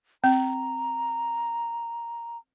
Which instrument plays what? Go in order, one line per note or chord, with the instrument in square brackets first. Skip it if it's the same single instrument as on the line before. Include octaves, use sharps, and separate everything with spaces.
[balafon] C4 [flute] A#5